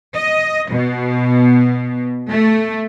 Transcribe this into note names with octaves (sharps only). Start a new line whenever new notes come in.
D#5
B2
A3